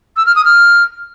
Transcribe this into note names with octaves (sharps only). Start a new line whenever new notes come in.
E6
F6
D#6
F6